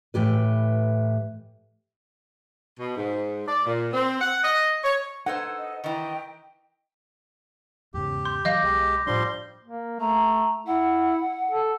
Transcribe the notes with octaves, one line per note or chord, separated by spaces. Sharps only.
A2 E3 G4 B4
B2
G#2
D5
A#2
C4
F#5
D#5
C#5
D#4 A4 B4 C5 F#5 G#6
D#5
D#3 E3 D#5 G5
E2 G#2 C#3 G4
C6 G6
E3 F#3 D#5 F5 D6 G6 A#6
B1 G#3 G4
A2 F3 G3 D4 C6
A#3
A3 A#5
E4 F#5
A4